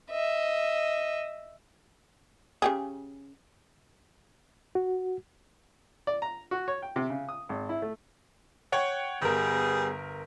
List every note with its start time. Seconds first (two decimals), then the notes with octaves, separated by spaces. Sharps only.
0.10 D#5 E5
2.62 C#3 G4 G#4
4.75 F#4
6.07 D5
6.22 A#5
6.51 F#4
6.68 C#5
6.82 G5
6.96 C3
7.10 C#3
7.29 D#6
7.49 G#1
7.69 E4
7.82 A3
8.72 C#5 F#5 G5
9.22 G1 G3 B3 G#4 A#4